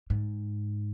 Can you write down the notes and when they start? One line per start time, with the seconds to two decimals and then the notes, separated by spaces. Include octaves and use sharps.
0.10 G#2